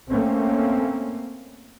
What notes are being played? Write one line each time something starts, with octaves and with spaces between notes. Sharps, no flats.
A3 A#3 C4 C#4